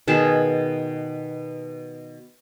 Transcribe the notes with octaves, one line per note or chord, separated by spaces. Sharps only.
B2 D#3 G#4 A5